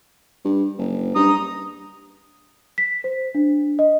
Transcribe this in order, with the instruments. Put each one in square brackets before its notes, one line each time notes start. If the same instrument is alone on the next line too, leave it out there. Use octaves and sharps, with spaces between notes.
[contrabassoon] G2
F#1
[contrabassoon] G2 [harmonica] A#5 D#6
[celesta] B6
C5
D4
D#5